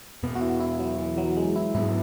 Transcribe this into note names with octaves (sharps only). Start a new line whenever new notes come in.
E2 B2 B3
F#4
E4
E4
F#3
E3
F#3
G#3
E4
G#2 F#3 B3 E4